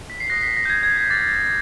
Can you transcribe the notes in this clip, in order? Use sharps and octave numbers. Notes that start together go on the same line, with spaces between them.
B6
C7
D#6 F#6 A#6
B6
A#6
G6
G#6
G#6
G#6
D6 F6 A6